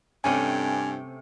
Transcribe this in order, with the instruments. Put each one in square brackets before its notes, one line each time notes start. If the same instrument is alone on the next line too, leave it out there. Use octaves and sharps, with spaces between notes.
[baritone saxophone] G2 [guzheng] C3 A3 C#4 [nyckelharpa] G5 [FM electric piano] G#5